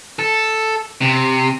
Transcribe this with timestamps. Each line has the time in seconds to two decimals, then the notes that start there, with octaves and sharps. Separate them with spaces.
0.19 A4
1.01 C3